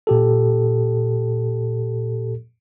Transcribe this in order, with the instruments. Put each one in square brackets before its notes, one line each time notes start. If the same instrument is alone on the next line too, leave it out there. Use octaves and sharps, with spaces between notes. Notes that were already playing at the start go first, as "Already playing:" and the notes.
[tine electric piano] A#2 G4 A4